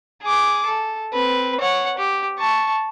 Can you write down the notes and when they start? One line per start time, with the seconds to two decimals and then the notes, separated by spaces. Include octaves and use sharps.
0.22 G#4 D6
0.66 A4
1.13 C4 B4
1.60 C#5 F#5
1.98 G4
2.39 A5 C#6